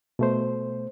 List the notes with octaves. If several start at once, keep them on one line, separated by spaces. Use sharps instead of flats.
B2 A3 C5